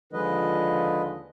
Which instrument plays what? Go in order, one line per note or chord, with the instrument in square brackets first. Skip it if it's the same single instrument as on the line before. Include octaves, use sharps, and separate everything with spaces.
[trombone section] D#2 D3 F3 [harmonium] G#3 B4 D#5